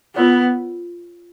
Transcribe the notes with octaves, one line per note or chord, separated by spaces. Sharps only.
B3 F4 A#4 C#5